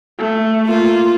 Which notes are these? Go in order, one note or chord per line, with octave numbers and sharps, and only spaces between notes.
A3
A#3 F4